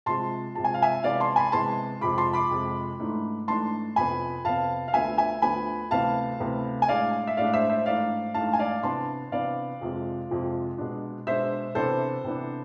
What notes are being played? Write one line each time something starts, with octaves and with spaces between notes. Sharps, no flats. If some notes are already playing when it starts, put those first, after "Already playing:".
C3 F3 G#3 A5 C6
C3 F3 G#3 A5
G#5
F5
E5 G#5
C3 E3 G#3 B3 D5 F5
A5 C6
G#5 B5
C3 E3 G#3 B3 A5 C6
F2 C3 F3 G#3 B5 D6
A5 C6
B5 D6
F2 C3 F3 G#3
G#2 E3 A3 D4
G#2 E3 A3 D4 A5 C6
F2 C3 F3 B3 G#5 B5
F2 C3 F3 B3 F5 A5
F5
D2 D3 F3 B3 E5 G#5
E5 G#5
D2 D3 F3 B3 G#5 B5
D2 C3 E3 B3 F5 A5
D2 C3 E3 B3
G#5
A2 G#3 D4 D5 F5
E5
A2 G#3 D4 D5 F5
C5 E5
C5 E5
G#2 E3 A3 D4 D5 F5
G#2 E3 A3 D4 F5 A5
G#5
D5 F5
C3 E3 B3 D4 A5 C6
C3 E3 B3 D4 D5 F5
F2 C3 F3 G#3
F2 C3 F3 G#3
B2 G#3 D4
B2 G#3 D4 C5 E5
C3 E3 B3 D4 A4 C5
C3 E3 B3 D4